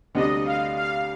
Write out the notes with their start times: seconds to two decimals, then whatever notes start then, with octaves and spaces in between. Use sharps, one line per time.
0.14 D2 C3 G3 D4 D#5
0.45 F5
0.77 F5